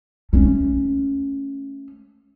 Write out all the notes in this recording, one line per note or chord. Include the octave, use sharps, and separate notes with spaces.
A3 C#4